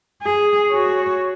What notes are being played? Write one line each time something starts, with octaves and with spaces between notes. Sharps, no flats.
G#4
F#4 C#5